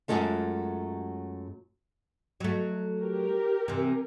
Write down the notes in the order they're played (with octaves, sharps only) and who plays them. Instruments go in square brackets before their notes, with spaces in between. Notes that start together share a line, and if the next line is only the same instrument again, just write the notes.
[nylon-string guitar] F#2 E3 F#3 G#3 A3 F4
[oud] F#3 A3
[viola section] G4 A#4
[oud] C3 E3